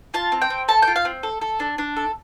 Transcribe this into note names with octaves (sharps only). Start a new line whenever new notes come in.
F4 A5
C4
G5
C4
A4 A5
G5
F4
F5
C4
A4
A4
D4
D4
A4